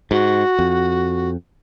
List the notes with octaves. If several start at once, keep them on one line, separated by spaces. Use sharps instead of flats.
G#2 F#4
F2